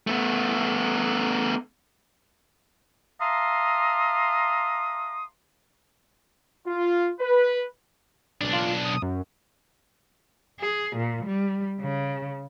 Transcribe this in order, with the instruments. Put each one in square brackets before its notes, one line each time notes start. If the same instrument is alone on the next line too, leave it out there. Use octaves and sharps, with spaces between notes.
[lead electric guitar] A3 B3
[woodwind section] E5 F5 A5 A#5 C6 D#6
[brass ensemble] F4
B4
[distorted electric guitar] B1 D4
[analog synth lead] F4
D#6
F#2
[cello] G#4
A#2
G3
C#3